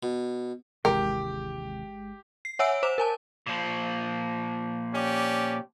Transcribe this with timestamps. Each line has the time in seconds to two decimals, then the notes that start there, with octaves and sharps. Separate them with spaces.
0.03 B2
0.85 G1 D#2 C3 E3 G#3 G4 A#4 G5
2.45 C7
2.59 C#5 E5 F#5 G#5 E6 D7
2.83 C5 D6 E7
2.98 A#4 G#5 A5
3.47 A#2 F3
4.95 C#4 G4 D5